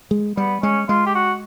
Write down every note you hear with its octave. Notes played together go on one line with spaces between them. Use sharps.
G#3
G3 B3
G#3 C#4
G#3 F4
G4
F#4